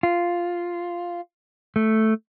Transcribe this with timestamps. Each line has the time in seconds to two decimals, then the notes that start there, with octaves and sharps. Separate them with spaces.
0.03 F4
1.76 A3